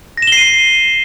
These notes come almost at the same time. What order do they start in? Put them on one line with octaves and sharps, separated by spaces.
A#6 E7 G7 C7 D#7